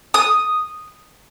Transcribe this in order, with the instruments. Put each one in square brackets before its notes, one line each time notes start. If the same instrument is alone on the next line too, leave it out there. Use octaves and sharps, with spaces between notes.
[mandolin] D#6